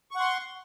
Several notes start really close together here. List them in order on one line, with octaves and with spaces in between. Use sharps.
C#6 F#5 C6